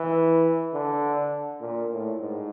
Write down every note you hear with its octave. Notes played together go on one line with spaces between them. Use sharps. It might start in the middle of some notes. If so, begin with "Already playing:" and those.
Already playing: E3
D3
A#2
A2
G#2